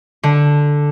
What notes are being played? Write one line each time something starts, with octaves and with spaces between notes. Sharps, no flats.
D3